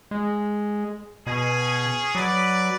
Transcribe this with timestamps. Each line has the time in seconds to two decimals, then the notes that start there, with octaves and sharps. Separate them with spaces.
0.11 G#3
1.27 B2 C#4 G#4
2.15 F#3 B4 D5